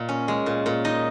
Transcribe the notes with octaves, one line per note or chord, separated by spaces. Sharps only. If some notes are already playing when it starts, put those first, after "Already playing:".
Already playing: A#2 D#5
C#4
G#3
A#2
A#2
D#4 D#5